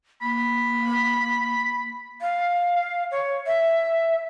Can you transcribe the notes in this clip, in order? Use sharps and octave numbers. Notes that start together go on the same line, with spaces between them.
A#3 B5
F5
C#5
E5